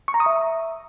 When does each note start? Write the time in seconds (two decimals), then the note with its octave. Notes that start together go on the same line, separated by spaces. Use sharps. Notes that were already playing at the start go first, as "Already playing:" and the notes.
0.08 C#6
0.14 A#5
0.20 D#6
0.26 E5